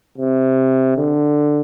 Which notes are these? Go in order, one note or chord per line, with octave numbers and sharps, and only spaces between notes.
C3
D3